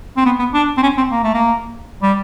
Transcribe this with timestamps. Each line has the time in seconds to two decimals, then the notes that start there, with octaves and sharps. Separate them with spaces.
0.17 C4
0.25 B3
0.39 B3
0.54 D4
0.77 C4
0.83 C#4
0.98 C4
1.11 A#3
1.24 A3
1.34 A#3
2.03 G3